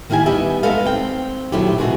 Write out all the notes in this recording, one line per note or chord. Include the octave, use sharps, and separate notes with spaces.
D#3 A#3 E4 G4 G#5
G3 B3 G4 D#5 E5
G#3 A3 B3 D#4 A4 F5
C4 G5
D#2 A#2 F#3 A3 E4 G4
C3 E3 G#3 A3 F#4